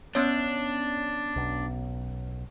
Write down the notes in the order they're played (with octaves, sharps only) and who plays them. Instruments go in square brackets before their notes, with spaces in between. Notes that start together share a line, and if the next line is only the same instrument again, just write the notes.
[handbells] B3 C#4 C#5 [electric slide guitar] D4
[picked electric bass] B1